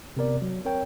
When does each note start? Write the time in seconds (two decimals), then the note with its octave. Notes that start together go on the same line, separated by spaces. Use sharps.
0.17 C3 B3 A#4 D5
0.42 F#3
0.65 C4 A#4 C#5 G5